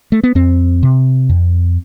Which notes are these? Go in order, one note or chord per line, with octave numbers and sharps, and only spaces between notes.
A3
B3
F2 C4
C3
F2